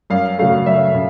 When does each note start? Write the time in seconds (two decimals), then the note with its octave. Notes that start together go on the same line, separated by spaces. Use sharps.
0.10 F#2 F5
0.39 C#3 F#3 A3 F5
0.66 F#2 E5
0.95 C#3